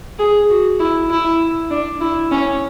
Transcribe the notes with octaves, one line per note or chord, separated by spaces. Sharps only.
G#4
F#4
E4
E4
D4
E4
C#4